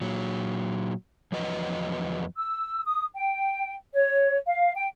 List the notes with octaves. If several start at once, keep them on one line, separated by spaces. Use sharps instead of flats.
A#2 F#3
E2 F3 F#3 B4 D#5
E6
D#6
G5
C#5
F5
G5